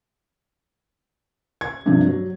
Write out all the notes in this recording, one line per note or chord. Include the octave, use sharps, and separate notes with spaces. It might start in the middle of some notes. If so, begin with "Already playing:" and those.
G#6
G2 C3 F3
F#3